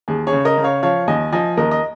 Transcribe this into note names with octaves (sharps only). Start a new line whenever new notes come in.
D#2 G#4
G#4 C#5
C#3
A#4 D#5
C#3
C#5 F5
F3 C#5 F5
D#2 D#5 G#5
F3 D#5 G#5
D#2 A#4 D#5
D#5